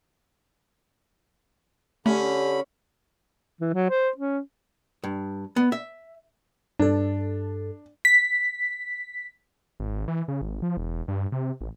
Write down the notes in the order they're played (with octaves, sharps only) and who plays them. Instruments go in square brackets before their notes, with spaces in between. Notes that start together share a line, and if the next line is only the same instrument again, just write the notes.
[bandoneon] D3 B5 [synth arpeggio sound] A3 [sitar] C#4 [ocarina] G4
[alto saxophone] E3
F#3
C5
C#4
[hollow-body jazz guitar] G2
B3
E5
[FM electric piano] G2 A4 [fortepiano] D4
[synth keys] B6
[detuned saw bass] G#1
E3
C#3
G#1
F3
E1
G2
C3
A1